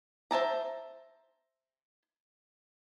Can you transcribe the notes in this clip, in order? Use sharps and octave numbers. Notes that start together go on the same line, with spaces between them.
C5 E5 A5 A#5